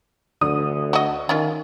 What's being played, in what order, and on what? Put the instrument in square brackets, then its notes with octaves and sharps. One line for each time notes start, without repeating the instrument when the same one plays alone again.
[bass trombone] D2 [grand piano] D3 [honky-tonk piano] D#6
[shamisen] F#4 D#5
[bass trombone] D#3 [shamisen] C#4 F4